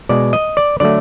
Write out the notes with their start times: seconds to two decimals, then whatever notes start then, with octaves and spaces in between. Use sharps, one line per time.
0.09 B2 G#3 D5
0.33 D#5
0.57 D5
0.80 D3 F#3 A3 D5